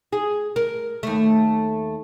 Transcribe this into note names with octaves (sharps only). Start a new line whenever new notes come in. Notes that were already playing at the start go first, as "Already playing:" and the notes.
G#4
A#4
D#2 A3